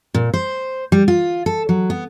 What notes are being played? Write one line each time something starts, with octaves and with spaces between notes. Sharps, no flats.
A#2
C5
G3
F4
A4
F#3
B3